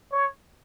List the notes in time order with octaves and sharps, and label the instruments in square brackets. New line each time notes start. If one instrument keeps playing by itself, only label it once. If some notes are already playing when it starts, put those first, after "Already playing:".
[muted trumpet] C#5